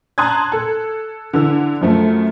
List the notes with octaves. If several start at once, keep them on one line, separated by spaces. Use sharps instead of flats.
A5 A#5 C6 D#6 F#6 G#6
A4
D3 E3 E6
F#2 F3 A3